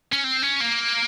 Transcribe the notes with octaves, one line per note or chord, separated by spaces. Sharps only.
C#4
C4
C#4
A#3